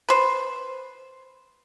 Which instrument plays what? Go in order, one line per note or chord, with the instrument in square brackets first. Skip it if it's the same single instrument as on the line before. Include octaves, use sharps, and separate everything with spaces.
[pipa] B4 C5